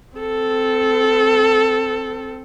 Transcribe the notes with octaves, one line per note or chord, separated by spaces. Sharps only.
C4 A4